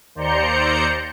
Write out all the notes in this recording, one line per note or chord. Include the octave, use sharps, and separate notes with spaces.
D#2 C5 D5 A#5 G6 C#7